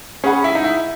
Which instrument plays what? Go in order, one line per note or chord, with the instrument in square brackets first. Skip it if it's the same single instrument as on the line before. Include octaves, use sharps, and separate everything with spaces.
[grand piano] C#4 [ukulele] G#4 B4 F#5 B5
[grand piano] E4
D#4
E4